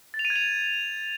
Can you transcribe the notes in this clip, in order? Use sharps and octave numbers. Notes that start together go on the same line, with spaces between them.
A6
F7
D#7
G#6
F7